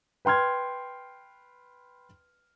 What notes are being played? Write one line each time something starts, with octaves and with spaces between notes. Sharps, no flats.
B4 G5 C6 F6 G#6